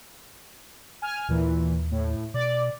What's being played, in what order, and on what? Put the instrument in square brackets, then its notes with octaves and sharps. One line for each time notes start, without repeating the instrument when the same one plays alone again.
[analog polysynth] G#5 F6
[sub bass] D#2 [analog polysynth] A#2 E3
[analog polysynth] A2
[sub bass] B2 [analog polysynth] D5